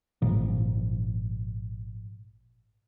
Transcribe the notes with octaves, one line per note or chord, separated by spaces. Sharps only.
G#1 A#2 F3